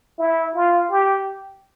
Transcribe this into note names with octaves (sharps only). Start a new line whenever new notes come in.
E4
F4
G4